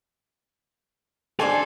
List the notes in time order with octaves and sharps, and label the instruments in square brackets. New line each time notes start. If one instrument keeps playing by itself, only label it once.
[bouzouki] D4 C5 G#5 [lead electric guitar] A4